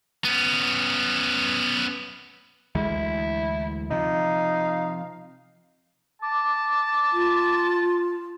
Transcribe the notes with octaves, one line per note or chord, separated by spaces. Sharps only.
B3 C#4
D2 E3 G#3 E4
C3 F3 D#4 F5
A5 D6
F4